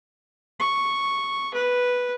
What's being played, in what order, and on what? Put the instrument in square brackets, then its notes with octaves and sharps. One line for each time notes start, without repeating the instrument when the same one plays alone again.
[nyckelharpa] C#6
B4